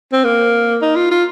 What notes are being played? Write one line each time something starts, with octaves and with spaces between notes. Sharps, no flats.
C4
A#3
D#4
F4
F4